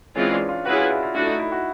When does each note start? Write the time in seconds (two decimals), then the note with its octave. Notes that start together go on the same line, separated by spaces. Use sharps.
0.16 E3 G#3 C4 C#4 F4
0.32 D4
0.49 F4
0.65 C#4 E4 F#4 G#4 B4
0.78 F4
0.90 E4
1.03 F4
1.15 A3 D4 E4 F#4
1.27 D#4
1.40 E4
1.52 F#4